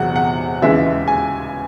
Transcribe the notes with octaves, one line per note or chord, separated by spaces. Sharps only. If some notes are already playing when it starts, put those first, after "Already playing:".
Already playing: E1 E2 C3 F#3 F#5
F#5
D#2 C#3 E3 G#3 E5
G#5